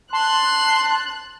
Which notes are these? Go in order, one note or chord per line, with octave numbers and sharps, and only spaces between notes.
A5 C6 F#6